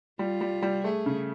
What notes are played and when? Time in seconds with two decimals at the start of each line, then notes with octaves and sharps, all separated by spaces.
0.19 G3 F4
0.41 G3
0.62 G3
0.84 A3 G#4
1.06 C#3